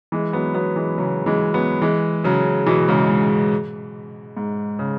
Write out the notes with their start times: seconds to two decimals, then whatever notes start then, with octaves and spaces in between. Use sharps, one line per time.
0.12 E3 G#3
0.33 F#3 B3
0.54 F#3 B3
0.76 E3 G#3
0.98 C#3 F#3
1.26 E3 G#3
1.54 F#3 B3
1.82 E3 G#3
2.24 C#3 F#3
2.66 B2 E3
2.88 G#2 C#3
3.09 G#2
4.37 G#2
4.79 C#3